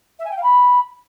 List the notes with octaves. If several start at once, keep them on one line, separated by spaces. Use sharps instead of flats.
E5
G#5
G5
F5
B5